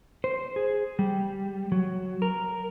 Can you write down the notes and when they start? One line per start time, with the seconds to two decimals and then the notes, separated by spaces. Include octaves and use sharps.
0.24 C5
0.56 G#4
0.99 G3
1.72 F#3
2.22 A#4